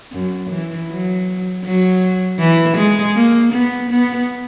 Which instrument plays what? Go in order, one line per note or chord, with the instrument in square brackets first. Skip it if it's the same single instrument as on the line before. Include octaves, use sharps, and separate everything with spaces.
[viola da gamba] F#2
E3
F#3
F#3
E3
G#3
A#3
B3
B3